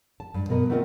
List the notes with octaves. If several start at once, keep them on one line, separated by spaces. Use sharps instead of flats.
A5
G2
B2 B3 A#4 D#5
A3 B3 C4 F4 A#4 D#5